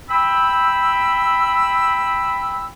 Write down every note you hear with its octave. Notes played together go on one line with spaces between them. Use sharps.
G5 B5 E6